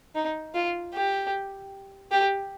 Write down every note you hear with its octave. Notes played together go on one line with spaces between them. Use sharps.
D#4
F4
G4
G4